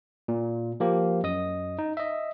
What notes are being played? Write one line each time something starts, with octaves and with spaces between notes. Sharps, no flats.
A#2
F3 A#3 G4
F#2 D#5 D#6
D#4
D#5 E5